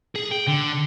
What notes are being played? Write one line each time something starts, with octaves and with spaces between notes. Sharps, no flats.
G#4
G5
D3